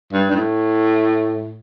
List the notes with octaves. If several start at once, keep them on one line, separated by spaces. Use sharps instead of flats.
G2
G2
A2